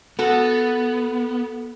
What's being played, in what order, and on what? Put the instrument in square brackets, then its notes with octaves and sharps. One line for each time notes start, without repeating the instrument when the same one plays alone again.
[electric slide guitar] B3 [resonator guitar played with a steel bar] F#4 A4